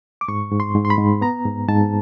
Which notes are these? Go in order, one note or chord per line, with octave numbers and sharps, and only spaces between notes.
D6
G#2 C#6
G#2
C6
G#2
C6
B5
G#2
B3 A#5
G#2
G#2 A5